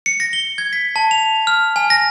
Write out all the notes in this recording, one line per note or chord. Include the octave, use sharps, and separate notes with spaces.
C#7
A#6
G7
G#6
B6
A5
F7
F6
G#5
A#6